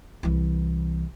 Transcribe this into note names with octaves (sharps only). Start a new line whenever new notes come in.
C2 E3